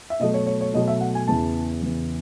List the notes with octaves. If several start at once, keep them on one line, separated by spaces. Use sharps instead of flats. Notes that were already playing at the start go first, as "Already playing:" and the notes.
E5
B2 F#3 A3 D#5
C#5
C#5
C#5
B2 F#3 A3 D#5
E5
F#5
G#5
E2 C#3 E3 B3 A5
E2 C#3 E3 B3